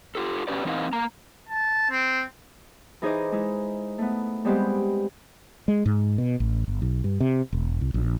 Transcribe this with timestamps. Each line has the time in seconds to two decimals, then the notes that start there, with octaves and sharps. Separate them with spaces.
0.15 F4 G4 A4
0.48 B2 F3 C#4 G4 B4 D5
0.65 E3 C4 D#4 A#4 D#5 F5
0.93 A#3 A#5
1.49 A5
1.90 C4
3.02 E3 D#4 G#4 C5 D#5 D6
3.32 G#3 D#4 E4
3.98 A3 B3
4.45 G3 G#3 B3 C4 G4 C5
5.68 G#3
5.86 G#2
6.18 B2
6.40 A1
6.68 G1
6.82 B1
7.04 G2
7.20 C3
7.53 E1
7.81 C2
7.94 A#1